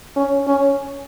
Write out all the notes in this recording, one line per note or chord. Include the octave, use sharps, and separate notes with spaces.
C#4
C#4